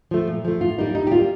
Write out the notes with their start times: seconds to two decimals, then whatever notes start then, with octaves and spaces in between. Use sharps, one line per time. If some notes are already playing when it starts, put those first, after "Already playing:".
0.11 F3 A3
0.28 A#2
0.44 F3 A3
0.61 A2 F4
0.78 G3 A#3 D#4
0.95 A2 D#4
1.07 G4
1.11 G3 A#3 F4